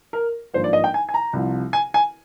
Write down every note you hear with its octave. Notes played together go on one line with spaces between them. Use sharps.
A#4
G#1 G2 F3 A#3 C5
D5
D#5
G5
G#5
G#5
A#5
C2 C3 F3
G#5
G#5